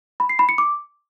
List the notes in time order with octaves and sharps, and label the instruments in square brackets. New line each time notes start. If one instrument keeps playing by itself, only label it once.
[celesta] B5
C7
B5
C#7
D6